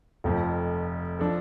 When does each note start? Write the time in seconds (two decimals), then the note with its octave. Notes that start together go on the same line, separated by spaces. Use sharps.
0.24 F1 F2 F3
1.19 F3 D4 A4